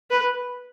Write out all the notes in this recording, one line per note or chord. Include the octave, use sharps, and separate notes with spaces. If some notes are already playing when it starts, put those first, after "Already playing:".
B4